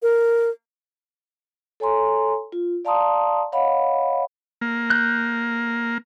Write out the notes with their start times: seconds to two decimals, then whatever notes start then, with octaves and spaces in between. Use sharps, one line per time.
0.03 A#4
1.80 A4 C#5 G#5 A#5 C6
2.52 F4
2.85 D5 F5 A5 A#5 C6 D#6
3.52 C#5 D#5 F5 F#5 B5
4.61 A#3
4.90 F#6 G6